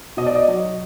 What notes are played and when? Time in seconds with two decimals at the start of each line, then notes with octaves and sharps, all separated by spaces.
0.17 B2 D#5
0.26 D5
0.36 D#5
0.48 F#3